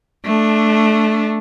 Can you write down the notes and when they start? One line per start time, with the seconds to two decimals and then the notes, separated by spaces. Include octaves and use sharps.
0.25 A3 D4